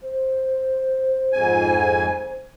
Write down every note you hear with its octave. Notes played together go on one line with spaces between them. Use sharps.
C5
F2 G#2 G#5